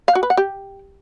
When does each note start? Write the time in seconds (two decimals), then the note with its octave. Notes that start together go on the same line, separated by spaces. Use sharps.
0.08 F5
0.15 F#4
0.23 B4
0.30 F#5
0.37 G4